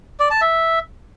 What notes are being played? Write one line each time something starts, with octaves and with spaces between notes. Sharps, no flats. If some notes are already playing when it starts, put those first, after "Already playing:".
D5
A5
E5